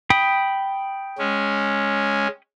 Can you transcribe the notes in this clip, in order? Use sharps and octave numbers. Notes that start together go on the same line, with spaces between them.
G5 B5 D#6
G#3 C#4